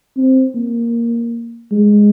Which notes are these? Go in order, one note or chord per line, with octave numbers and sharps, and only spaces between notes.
C4
A#3
G#3